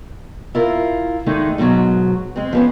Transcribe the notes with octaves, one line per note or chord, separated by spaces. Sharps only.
E4 F4 A#4
D#3 G#3 A3 D4 D#4
G#2 B2 E3 F#3
G#3 C4
F3 B3 C#4